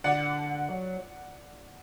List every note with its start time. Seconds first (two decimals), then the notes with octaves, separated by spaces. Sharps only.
0.04 D3 D5 F#5
0.69 F#3